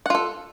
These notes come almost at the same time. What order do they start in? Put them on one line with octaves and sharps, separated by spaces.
F#5 F4 A4